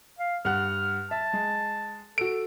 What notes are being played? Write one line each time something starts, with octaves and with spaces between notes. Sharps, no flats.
F5
G2 F#5 F6 F#6
E5 A5
G#3
F#4 A4 D7